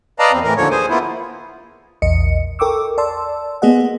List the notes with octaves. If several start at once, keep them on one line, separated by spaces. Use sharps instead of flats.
B4 D5 D#5 F5 A5 A#5
E2 C4
A2 E3 A#4
D#2 D3 F3 C#5
G#4 C5 G#5
A#3 B3 E4 F4
A#1 E2 D#5 C#7
A4 A#4 G5 C#6 D6 E6
D5 A5 C6 E6
A#3 B3 G#4 D#5 F#5